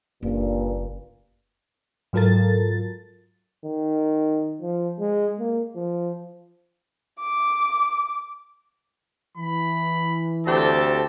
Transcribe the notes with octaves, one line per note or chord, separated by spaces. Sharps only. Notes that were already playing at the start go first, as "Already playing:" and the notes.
F#1 G2 A#2
G#2 F#3 F4 A4 A#4 A6
D#3
F3
G#3
A#3
F3
D6
E3 B5
D2 C4 G4 A4 A5